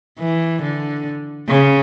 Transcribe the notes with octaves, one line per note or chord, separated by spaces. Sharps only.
E3
D3
C#3